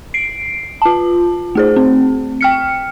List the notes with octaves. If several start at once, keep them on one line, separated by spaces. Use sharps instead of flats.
C7 D7
F4 A5
A3 G#4 C5
C4
G5 F6 C#7